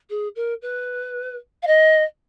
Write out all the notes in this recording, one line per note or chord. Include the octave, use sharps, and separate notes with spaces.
G#4
A#4
B4
F5
D#5